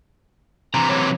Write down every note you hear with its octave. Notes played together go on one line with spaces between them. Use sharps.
C3 E3 A#5
F#3 C#5